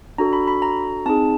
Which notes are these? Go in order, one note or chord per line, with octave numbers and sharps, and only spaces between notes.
D4 F#4 A4 A#5
B5
B5
A#5
C4 D#4 G#4 A5